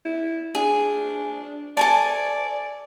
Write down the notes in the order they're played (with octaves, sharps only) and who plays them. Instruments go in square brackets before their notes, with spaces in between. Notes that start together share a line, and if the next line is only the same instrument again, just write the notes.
[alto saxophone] E4
[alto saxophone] D4 [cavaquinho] G#4
[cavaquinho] A4 G#5 A5 [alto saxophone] D5